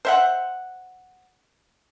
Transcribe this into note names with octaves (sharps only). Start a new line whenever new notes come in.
C5 E5 F#5